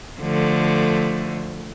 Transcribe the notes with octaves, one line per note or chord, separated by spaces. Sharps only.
D3 F3 A3